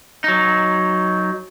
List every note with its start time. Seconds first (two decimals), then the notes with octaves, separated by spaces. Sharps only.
0.24 F#3 D#4